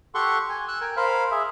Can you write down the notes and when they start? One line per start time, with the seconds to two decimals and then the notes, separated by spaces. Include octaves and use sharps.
0.15 G4 A4 F#5 C6 C#6
0.50 G#5
0.68 E6 F#6
0.81 A#4 G5 G#5
0.97 A#4 C5 F5 B5
1.31 G#4 E5